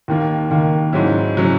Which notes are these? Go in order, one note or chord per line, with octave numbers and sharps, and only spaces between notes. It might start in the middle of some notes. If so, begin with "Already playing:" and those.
D#2 D#3 A#3
D#2 D#3 A#3
G#2 F#3 C#4 E4
F#3 C#4 E4